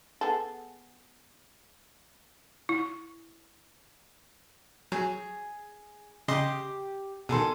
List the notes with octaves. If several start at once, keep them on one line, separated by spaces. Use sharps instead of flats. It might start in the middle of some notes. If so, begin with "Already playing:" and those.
B3 G#4 A4
E4
F#3 G#4
C#3 G4 D#5 C6
B2 D#3 G#4 A4 C6